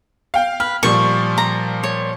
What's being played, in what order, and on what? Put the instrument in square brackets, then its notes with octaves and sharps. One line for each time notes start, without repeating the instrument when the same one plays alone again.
[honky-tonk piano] F5 G5
[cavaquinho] B4 [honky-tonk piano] F6
[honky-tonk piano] A#2 F3 G3 [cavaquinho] C#6
[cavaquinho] A#5
C#5